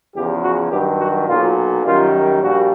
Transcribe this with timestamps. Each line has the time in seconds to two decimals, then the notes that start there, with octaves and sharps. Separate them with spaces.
0.15 E2 C#3 F3 G4
0.43 F#4
0.71 G2 D#3 F#3 G4
0.99 F#4
1.28 B1 A#2 F#3 F4
1.84 F#2 D#3 G3 F4
2.41 A#1 A#2 G3 F#4